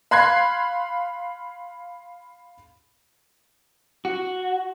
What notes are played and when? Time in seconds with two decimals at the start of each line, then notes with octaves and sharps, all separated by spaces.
0.11 F5 B5 C6 F#6 G#6 C7
4.05 F#4